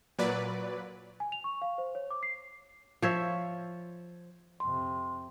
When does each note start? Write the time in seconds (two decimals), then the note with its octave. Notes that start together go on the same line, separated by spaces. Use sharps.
0.19 A#2 F#3 B4 D5
1.20 G#5
1.32 F7
1.44 C#6
1.62 F5
1.78 C5
1.95 C#5
2.11 D6
2.23 C7
3.02 F3 C#5 E5
4.60 F2 C3 C6